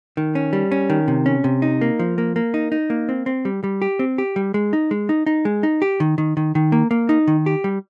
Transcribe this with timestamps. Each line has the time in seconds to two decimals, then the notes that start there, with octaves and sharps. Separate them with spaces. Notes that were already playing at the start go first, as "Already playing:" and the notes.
0.17 D#3
0.35 C#4
0.53 G3
0.72 C#4
0.90 D#3
1.08 C3
1.26 C#4
1.44 C3
1.62 D#4
1.81 A#3
1.99 F3
2.18 A#3
2.36 A#3
2.54 D#4
2.72 D#4
2.90 A#3
3.09 C4
3.26 C4
3.45 G3
3.64 G3
3.82 G4
3.99 C4
4.18 G4
4.36 G3
4.54 G#3
4.73 D#4
4.91 G#3
5.09 D#4
5.26 D#4
5.45 G#3
5.63 D#4
5.82 G4
6.00 D#3
6.18 D#3
6.37 D#3
6.55 D#3
6.72 A#3
6.91 A#3
7.09 D#4
7.27 D#3
7.46 G4
7.64 G3